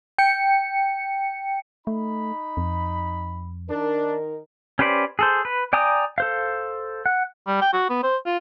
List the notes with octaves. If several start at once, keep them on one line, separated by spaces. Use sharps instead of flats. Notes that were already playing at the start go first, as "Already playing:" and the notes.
G5 C#7
A3 D#4 B5
F2
D#3 D4 D#4 A#4
C#4 G4 B4 C5 D5
G#4 A4 C5
B4
D5 G5 G#5 A#5 D#6
A4 C5 F5
F#5
G3
G5
F#4
B3
C5
F4